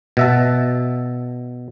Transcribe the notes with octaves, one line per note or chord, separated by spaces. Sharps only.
B2 E5 A5